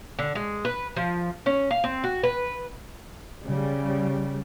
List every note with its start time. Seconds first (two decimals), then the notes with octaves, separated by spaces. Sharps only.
0.19 D3
0.35 G#3
0.65 B4
0.96 F3
1.46 C#4
1.71 F5
1.84 C4
2.04 F#4
2.23 B4
3.46 C#3 G3